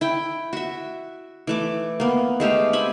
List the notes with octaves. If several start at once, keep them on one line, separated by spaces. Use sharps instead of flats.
E4 G5
F#4 E5
E3 A3 D6
A#3 B3
G#3 A3 G4 F5
C4 G#5 B5